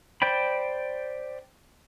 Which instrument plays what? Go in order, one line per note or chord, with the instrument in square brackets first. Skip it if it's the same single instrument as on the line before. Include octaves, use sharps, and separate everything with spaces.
[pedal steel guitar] C5 D5 G5 B5